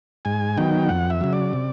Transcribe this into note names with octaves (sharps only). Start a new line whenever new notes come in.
G#2 G#5
D#3 F#3 B3 D#4 G5
F2 F#5
E5
C#3 F#3
D5
C3